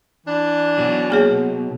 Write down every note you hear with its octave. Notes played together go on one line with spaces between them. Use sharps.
E3 D4
B2 F#3
A#3 G#4 C#5